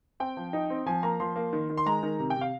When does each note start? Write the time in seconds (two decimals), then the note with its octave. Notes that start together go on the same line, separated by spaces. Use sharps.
0.20 C4 G5
0.37 F3
0.53 D#4
0.70 C4
0.86 F3 G#5
1.03 A#3 A#5
1.20 F3 C6
1.36 A#3
1.53 D#3
1.69 D#3
1.77 C6
1.86 G#3 A#5
2.03 D#3
2.20 C3
2.30 G5
2.36 C3
2.41 F5